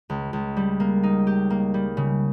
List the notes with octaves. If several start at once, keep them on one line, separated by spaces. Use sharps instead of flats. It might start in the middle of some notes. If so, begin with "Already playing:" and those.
C#2
C#2
G3
A#3
D#4
G4
A#3
G3
C#3